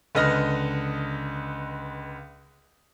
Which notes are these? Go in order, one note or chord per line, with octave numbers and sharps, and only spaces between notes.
C#2 D3 B4 D#5 F6 A#6